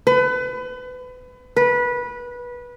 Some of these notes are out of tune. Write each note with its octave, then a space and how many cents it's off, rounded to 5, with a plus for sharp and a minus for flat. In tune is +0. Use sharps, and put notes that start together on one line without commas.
B4 +30
B4 -20